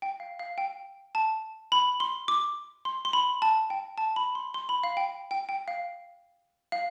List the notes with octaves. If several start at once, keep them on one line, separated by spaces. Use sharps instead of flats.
G5
F5
F5
G5
A5
B5
C6
D6
C6
C6
B5
A5
G5
A5
B5
C6
C6
B5
F5
G5
G5
G5
F5
F5